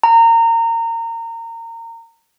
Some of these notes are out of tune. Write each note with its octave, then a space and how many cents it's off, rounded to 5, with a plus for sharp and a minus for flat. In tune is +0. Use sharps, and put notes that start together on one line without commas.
A#5 -25